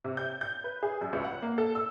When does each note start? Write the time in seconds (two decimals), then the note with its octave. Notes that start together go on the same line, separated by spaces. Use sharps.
0.04 C3
0.17 G6
0.41 G6
0.64 B4
0.83 G#4
1.01 F#2
1.13 C#2
1.24 F#5
1.42 A#3
1.58 A4
1.75 E6